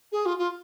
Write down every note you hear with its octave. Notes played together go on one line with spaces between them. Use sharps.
G#4
F4
F4